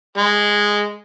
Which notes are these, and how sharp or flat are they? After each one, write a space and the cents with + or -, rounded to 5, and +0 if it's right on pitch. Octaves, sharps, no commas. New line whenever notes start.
G#3 -5